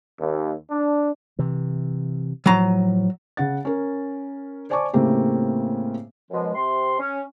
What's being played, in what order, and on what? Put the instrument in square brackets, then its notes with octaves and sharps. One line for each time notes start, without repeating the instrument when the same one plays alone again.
[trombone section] D#2
D4
[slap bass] C3 E3
[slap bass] A2 F3 [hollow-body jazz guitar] F#3 A#5
[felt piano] C#3 F#5 A6
C#4 A#4
C5 D5 G#5 A5 C#6 D6
A2 C#3 A3 A#3 C4 G4
[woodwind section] F#2 B2 F3 G#3
C3 C6
C#4